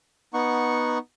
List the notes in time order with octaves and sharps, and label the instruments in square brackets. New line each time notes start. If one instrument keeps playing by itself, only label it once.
[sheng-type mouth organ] B3 D#4 F#5 C#6